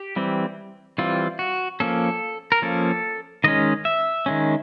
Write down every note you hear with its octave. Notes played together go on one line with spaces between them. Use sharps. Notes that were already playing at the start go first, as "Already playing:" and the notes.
Already playing: G4
E3 G3 C4
E3 G3 C4 F4
F#4
F3 A#3 C#4 A4
A#4
F3 A#3 C#4 A4
D#3 G#3 C#4 D#5
E5
D#3 G#3 C#4